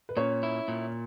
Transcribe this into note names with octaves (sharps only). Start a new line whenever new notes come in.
B4
A#2 C#4 C#5
E4
A#2